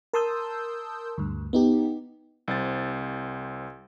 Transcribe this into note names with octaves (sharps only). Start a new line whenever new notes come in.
A#4 A5 C6 D#6 E6 G6
D2 G2
B3 D#4 G4
C2 C4 C5 A6